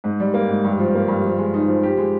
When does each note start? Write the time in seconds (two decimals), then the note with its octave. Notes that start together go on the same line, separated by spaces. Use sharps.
0.04 G#2
0.20 G3
0.34 A#3
0.49 G#2
0.64 G2
0.79 F3
0.94 A#3
1.08 G2
1.24 F3
1.38 G#3
1.54 D#4
1.68 F3
1.83 G4
1.98 G#3